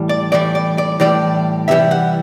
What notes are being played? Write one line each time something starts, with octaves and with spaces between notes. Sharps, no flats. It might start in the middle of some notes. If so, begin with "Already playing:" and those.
Already playing: A2 E3 G3
D5
A2 E3 G3 D5
D5
D5
A2 E3 G3 D5
C3 E3 G3 E5
F#5